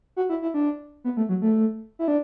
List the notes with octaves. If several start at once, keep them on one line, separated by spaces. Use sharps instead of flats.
F#4
E4
E4
D4
B3
A3
F#3
A3
E4
D4